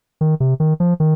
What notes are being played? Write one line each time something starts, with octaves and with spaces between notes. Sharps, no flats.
D#3
C3
D#3
F3
D#3